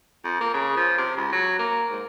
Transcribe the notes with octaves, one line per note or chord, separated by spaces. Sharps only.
F2
A#3
C#3
F3
C3
C#2
F#3
A#3
G#2